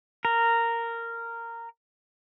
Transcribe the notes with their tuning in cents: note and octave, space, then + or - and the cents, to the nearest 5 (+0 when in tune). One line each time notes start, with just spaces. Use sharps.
A#4 -10